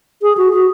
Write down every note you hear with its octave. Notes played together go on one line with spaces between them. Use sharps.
G#4
F#4
F#4